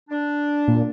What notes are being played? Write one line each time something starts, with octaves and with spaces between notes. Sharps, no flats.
D4
A#2